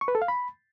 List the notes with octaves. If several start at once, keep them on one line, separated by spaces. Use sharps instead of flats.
C#6
B4
A4
F5
B5